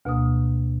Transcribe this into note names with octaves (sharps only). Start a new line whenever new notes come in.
D2 B2 A#3 D#6